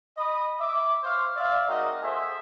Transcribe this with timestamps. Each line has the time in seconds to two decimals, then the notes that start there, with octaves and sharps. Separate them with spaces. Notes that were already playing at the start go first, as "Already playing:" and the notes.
0.18 D#5 B5 D#6
0.60 E5 D6
1.03 C5 C#5 F5
1.37 D5 E5 F5
1.68 G#3 C4 D#4 F#4 A#4 D#5
2.03 A#3 G#4 A4 C5 E5